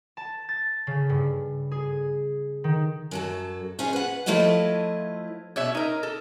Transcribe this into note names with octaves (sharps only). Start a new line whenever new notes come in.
A5
A6
C#3
G2
G#4
D#3
F#2 F#3 A4
C#4 F4 G#4 C5 C#5
B4 F#5
F3 A3 E4 F4 C#5 D#5
B2 C#5 E5
D#4 A#4
A4